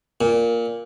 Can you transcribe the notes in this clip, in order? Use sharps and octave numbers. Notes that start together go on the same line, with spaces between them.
A#2